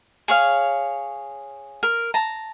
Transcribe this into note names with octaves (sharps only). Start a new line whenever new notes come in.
G#4 C#5 F5
A#4
A5 A#5